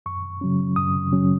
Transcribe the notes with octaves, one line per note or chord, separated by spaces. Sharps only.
F#2 C#6
C#3 F#3 C#4
F#2 D#6
C#3 F#3 C#4